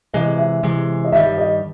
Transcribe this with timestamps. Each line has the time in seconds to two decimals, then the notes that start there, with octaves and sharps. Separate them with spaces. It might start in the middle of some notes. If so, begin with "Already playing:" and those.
0.14 C3 E3 G#3 D#5
0.38 E5
0.63 C3 E3 G#3
1.04 D#5
1.12 G2 D#3 G3 E5
1.38 D#5